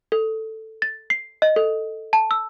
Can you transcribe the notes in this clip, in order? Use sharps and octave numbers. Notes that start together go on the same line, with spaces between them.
A4
A6
C7
D#5
A4
A5
E6